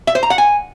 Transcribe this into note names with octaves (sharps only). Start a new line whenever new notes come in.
E5
C5
A#5
F#5
G#5